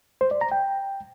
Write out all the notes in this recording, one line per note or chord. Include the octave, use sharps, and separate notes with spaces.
C5
D5
A#5
G5